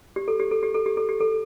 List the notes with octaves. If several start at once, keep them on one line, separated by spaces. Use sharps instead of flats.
G4
A4
G4
A4
G4
A4
G4
A4
G4
A4